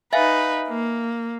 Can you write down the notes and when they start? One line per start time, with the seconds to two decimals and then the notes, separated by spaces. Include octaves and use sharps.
0.13 D#4 B4 E5 F5 G#5
0.68 A#3